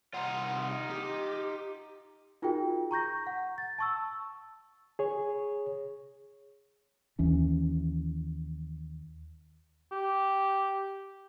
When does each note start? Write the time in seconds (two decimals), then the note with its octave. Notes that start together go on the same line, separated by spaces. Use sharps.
0.14 C2 D#4 F4 F#5
0.90 G4
2.42 D#4 F4 F#4 G#4 A#4 G5
2.91 A#5 C#6 G6 A#6
3.27 F#5
3.58 A6
3.78 A5 C#6 E6
4.99 G#4 C#5
7.19 D#2 E3 C#4
9.92 G4